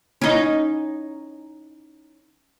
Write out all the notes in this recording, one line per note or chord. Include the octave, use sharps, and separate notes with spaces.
C#4 D#4